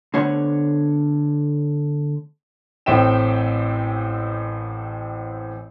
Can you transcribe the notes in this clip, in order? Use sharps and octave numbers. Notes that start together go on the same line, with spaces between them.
D3 A3 B3 C5 C#5 F#5
A1 A2 C4 E5 G5 E7